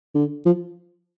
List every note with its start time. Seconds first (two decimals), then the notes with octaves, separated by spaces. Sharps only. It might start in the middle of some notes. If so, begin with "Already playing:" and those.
0.15 D3
0.46 F3